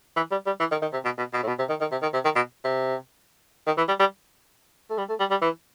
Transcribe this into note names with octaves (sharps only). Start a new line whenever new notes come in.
E3
G3
G3
E3
D#3
D#3
C3
B2
B2
B2
A2
B2
C3
D#3
D#3
C3
D#3
C3
D#3
B2
C3
D#3
E3
G3
G3
A3
G3
A3
G3
G3
E3